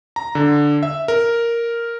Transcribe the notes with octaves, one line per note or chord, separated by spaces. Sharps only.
A#5
D3
E5
A#4